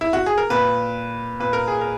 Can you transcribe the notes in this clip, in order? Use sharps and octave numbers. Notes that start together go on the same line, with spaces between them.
E4
F#4
G#4
A#4
A#2 B4
A#2 B4
A#4
G#4
A#4